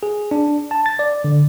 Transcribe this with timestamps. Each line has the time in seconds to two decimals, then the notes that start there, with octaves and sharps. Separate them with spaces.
0.03 G#4
0.31 D4
0.71 A5
0.86 A6
0.99 D5
1.24 D3